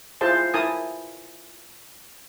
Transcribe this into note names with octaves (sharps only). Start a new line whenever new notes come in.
E4 F4 G#4 C5 A5 C6
E4 A#4 G#5 A5 D#6